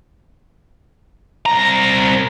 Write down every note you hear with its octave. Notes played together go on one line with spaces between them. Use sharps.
C2 A#5